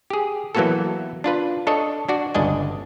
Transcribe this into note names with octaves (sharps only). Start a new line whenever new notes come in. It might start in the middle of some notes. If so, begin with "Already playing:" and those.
G4 G#4
E3 F#3 A#3 B3 F#4 A4
D4 F4 B4
D4 A4 C#5 D#5
D4 F#4 D5
G1 C#2 D4 D#5 G#5